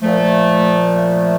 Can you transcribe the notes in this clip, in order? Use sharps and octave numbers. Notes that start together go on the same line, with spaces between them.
A#2 F3 A3
A3